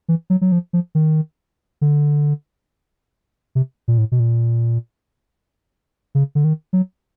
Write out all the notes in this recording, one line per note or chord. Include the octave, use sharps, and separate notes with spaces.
E3
F#3
F#3
F3
F3
D#3
D3
C3
A#2
A2
B2
A#2
C#3
D3
D#3
F#3